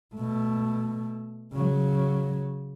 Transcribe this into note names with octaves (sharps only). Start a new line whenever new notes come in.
B2 A3
C#3 F#3